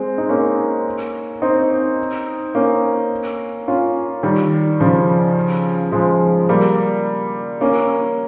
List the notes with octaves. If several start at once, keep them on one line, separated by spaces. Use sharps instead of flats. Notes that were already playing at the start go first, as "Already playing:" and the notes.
Already playing: G#3 C4
D#4
A#3 C#4
C4 D#4
A#3 C#4
C#4 F4
D#3 G3
C#3 F3
F3 G#3
G3 A#3
A#3 C#4